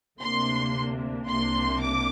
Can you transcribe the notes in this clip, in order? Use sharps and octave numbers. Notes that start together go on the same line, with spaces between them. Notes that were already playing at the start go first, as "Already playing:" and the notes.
D2 C3 A#3 D4 C6
C2 C3 A#3 D4 C6
D6